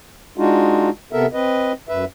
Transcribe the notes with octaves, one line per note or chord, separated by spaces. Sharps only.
G#3 D4 D#4 F4 F#4
C3 B3 A4 A#4 E5
C4 B4 D#5
F#2 B4 E5